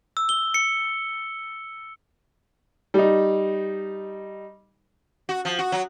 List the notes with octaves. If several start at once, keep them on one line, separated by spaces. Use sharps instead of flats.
E6
G7
C#7
G3 D#4
F#4
F3
F#4
F#3